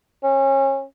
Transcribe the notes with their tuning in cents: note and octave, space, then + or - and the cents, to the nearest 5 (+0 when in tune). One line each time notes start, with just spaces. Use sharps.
C#4 -30